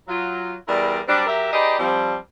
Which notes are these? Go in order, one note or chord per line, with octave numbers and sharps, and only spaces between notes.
F#3 F4
E2 G3 E4 A#4 D5
F#3 G3 C4 D4
F#3 G4 A#4 E5
D#4 G4 G#4 B4 D5 D#5
F3 G3 C4